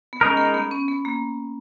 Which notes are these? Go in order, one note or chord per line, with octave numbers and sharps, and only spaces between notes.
B3
G#3 C#4 D#4 A#4
B3
B3
C#4
B3
A#3